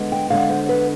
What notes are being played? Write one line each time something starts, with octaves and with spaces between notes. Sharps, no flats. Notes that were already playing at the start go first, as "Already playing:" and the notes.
Already playing: D3 G#3 B3
G5
D3 G#3 B3 F5
D5
C5
B4